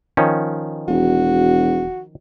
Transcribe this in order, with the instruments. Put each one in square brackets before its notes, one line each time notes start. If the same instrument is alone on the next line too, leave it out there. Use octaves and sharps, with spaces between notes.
[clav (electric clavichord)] D#3 F3 C#4
[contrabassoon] E1 [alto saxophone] F#4